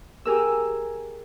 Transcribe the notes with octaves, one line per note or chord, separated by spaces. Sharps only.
G4 G#4 A#4 E6